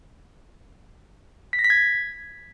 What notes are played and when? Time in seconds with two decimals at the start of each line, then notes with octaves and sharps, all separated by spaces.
1.53 B6
1.59 A#6
1.64 B6
1.70 G#6